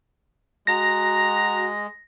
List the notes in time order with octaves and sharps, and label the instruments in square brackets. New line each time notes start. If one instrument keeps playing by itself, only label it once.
[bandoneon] G#3 [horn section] F#4 A#5 [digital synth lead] A#6